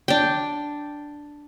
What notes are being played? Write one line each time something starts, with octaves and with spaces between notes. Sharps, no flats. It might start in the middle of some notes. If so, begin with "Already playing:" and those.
D4 G5